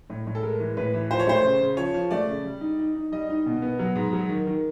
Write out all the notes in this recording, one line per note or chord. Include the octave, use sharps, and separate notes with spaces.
A2
A2
A4
G#3 A#4
E3
A2 B4
E3
F3 C5
C#5
A3 C5
C#3
C#3
F3 C#5
F3
A3 D5
C#3
G3
D#4
D#4
D#4
G3 D#5
D#4
B2
B3
F#3
G#2
F#3
D#3
D#3